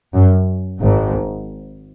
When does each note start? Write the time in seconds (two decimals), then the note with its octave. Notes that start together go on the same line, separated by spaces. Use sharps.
0.13 F#2
0.79 G#1 G#2